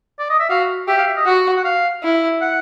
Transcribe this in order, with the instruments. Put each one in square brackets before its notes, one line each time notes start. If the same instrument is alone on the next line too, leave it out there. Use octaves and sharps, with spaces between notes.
[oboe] D5
D#5
E5
[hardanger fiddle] F#4 [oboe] F5
[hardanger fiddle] G4 [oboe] E5
[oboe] F5
E5
D#5
[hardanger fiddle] F#4 [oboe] F#5
[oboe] F#5
F5
[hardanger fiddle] E4
[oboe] F#5